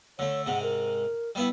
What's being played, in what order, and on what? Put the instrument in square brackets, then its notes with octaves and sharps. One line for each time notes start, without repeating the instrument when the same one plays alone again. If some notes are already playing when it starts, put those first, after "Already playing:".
[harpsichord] D3 A3 [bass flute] C#5
[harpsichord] G#2 C3 [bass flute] F#5
[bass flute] A#4
[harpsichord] G3 B3 E4